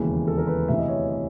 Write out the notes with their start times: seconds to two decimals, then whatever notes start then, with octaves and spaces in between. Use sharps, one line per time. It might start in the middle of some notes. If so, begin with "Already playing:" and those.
Already playing: E1 D#2 C#3 E3
0.27 A4
0.38 A#4
0.47 B4
0.68 D2 C3 E3 E5
0.79 D#5
0.88 C#5
1.09 C#5